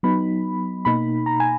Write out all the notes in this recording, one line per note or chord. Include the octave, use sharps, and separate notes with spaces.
F#3 B3 D#4 B5
B2 A#3 D#4 B5
A#5
G#5